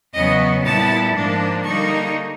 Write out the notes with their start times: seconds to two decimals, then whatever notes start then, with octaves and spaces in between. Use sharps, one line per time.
0.14 E2 C#3 F#3 B3 D#5
0.63 A#2 G3 B3 E4 A5
1.14 G#2 F3 A#3 D4
1.64 D3 G3 A#3 D#4 C#6